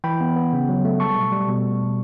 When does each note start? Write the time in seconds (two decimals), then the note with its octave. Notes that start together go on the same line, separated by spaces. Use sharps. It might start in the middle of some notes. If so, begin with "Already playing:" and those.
0.04 E3 G5 B5
0.21 B3
0.36 B3
0.53 C#3
0.69 F#3
0.85 A3
1.00 G3 A5 C#6
1.16 B2
1.32 G3
1.48 B2